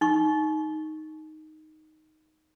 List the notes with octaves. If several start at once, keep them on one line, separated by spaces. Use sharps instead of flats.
D#4 C#6